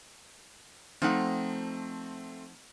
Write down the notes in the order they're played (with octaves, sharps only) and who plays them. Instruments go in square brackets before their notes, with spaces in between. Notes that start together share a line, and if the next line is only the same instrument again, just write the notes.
[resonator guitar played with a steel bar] F3 D#4 F#5 [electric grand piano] A3 C4